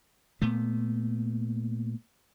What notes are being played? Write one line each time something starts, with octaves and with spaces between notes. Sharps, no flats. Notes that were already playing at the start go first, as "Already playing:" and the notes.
A#2 A3 B3